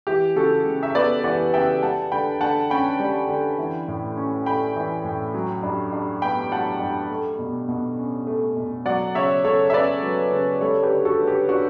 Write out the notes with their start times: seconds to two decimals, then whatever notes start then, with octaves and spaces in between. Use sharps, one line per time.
0.07 E3 G4
0.36 C#3 F#4 A4
0.66 C#3
0.83 E5
0.95 B3 B4 D5
1.24 E3 D5 F#5
1.53 C#3 E5 G5
1.82 G3 F#5 A5
2.12 D3 G5 B5
2.41 D3 F#5 A5
2.70 C#4 G5 B5
3.00 G3
3.29 D3
3.58 E3
3.88 A2
4.17 C#4
4.46 A3 G5 B5
4.76 E3
5.04 A2
5.34 F#3
5.63 G2
5.93 G2
6.22 B3 G5 B5
6.51 F#3 F#5 A5
6.80 G2
7.10 A3
7.39 B2
7.68 B2
7.98 C#4
8.27 A3
8.57 B2
8.86 F#3 D5 F#5
9.15 C#3 C#5 E5
9.44 C#3 A4 C#5
9.70 E5
9.73 C#4 B4 D5
10.03 F#3
10.32 C#3
10.61 G3 A4 C#5
10.83 G4 B4
10.91 D3
11.05 F#4 A4
11.20 D3
11.27 G4
11.49 D4 F#4